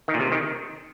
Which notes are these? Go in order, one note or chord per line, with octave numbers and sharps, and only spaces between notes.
D#3
A#2
C3
D#3